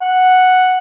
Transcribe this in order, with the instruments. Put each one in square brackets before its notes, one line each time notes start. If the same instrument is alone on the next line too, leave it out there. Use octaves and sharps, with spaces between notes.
[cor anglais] F#5